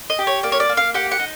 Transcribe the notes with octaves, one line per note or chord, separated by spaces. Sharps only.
D#5
G4
C#5
A#3 D5
C#5
D5
A#3
F5
G4 F#5
F#5
D#4